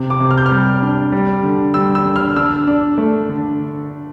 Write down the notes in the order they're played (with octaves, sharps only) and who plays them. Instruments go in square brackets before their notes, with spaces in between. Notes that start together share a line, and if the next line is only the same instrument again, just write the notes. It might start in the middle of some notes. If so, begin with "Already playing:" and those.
Already playing: [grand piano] C3
D6
C3
F6
G6
F6
G3
D4
G3
D3
G3 E6
E6
D3
F6
D4 E6
D4
A3
D3